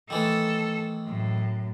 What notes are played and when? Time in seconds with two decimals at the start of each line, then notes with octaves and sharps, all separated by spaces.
0.10 D#3 E3 A3 A4
1.06 F#2 A2